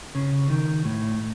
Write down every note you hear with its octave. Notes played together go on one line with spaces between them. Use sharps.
C#3
D#3
A2